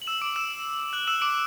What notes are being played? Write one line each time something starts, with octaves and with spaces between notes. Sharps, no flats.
F#7
E6 E7
D6 D7
E6 E7
F#6 F#7
E6 E7
D6 D7